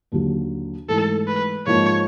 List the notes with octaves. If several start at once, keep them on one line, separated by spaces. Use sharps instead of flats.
D#2 D3 F#3
G#2 E3 A3 A4
B4
G#2 F3 A#3 C#5